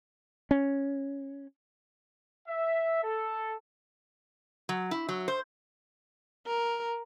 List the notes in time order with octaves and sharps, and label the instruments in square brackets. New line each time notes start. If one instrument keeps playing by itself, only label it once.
[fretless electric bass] C#4
[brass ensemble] E5
A4
[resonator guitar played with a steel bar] F#3
E4
F#3
C5
[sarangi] A#4